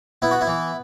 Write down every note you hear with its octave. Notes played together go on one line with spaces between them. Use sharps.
B3 E4
F#4
E4
E3